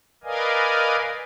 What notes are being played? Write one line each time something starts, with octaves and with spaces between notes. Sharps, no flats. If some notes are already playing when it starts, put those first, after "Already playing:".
A#4 B4 D5 D#5 F5 G#5